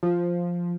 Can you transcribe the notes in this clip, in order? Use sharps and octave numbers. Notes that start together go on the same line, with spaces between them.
F3